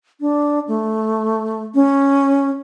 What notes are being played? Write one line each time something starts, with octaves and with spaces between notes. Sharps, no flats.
D4
A3
C#4